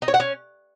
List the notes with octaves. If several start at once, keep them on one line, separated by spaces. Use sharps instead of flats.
D#4
C#5
F#5
C#4